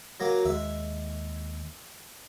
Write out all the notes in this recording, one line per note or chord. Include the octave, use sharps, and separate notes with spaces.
F#3 A#3
D#2 G#3 E5